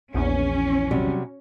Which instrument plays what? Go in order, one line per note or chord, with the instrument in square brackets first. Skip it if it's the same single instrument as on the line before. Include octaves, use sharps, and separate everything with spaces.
[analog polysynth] A#1 E2 [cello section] C#4
[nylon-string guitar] C3 F#3 G3